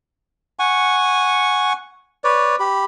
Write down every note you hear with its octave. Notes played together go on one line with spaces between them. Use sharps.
F#5 G#5 C#6
B4 C#5 D5
G4 B5